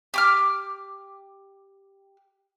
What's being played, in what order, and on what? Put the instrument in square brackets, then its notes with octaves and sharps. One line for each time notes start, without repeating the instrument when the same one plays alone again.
[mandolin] G4 D6 F6